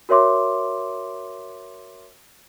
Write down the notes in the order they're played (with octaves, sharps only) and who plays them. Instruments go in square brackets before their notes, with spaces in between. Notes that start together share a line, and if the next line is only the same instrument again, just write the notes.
[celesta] F#4 A#4 C#5 E5 C6 D6